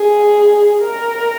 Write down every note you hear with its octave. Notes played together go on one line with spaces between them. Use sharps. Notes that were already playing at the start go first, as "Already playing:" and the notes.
Already playing: G#4
A#4